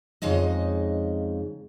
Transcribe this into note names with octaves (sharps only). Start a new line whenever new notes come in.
F2 C#3 G#3 D#4 D#5